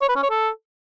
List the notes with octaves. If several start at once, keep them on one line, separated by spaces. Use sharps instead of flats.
C#5
B4
C#4
C#5
A4